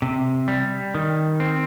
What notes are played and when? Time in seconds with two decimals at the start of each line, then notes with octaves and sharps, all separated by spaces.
0.02 C3
0.48 G3
0.95 D#3
1.40 C4